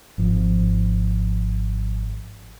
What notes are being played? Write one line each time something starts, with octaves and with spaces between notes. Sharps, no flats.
G#1 F3